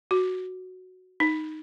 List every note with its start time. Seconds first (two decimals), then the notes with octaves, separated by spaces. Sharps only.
0.11 F#4
1.20 D#4